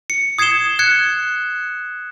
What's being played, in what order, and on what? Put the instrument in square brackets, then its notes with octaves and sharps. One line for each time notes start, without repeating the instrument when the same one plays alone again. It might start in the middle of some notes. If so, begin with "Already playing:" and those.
[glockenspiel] C#7
D#6 G#6 C7 C#7 E7 G7
F#6 G#6 C#7